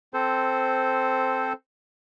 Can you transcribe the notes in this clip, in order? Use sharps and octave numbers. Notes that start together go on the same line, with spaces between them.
C4 A4 C5